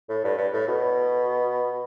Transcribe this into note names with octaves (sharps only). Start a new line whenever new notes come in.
A2
G2
G2
A2
B2